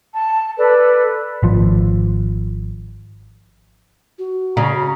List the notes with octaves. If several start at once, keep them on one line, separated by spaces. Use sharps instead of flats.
A5
A4 B4 D5
G#1 F3
F#4
C#3 A#5